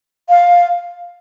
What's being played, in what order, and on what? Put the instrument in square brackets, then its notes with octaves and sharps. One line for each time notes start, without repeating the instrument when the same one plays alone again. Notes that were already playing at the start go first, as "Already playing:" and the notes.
[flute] F5